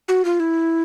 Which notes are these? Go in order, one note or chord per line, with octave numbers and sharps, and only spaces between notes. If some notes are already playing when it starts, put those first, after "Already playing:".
F#4
F4
E4